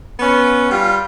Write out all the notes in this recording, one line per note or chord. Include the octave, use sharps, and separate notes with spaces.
B3 C#4 B4
G3 F4